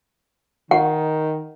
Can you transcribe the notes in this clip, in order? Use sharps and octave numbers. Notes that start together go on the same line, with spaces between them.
D#3 F#5